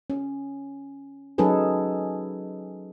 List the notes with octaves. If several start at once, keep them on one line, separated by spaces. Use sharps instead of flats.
C#4
F#3 C#4 D#4 G#4 A4 B4